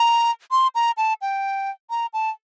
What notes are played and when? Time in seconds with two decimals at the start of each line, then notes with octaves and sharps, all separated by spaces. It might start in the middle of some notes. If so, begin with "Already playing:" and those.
Already playing: A#5
0.51 C6
0.75 A#5
0.97 A5
1.22 G5
1.90 A#5
2.13 A5